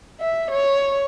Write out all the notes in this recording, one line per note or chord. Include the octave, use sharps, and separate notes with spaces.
E5
C#5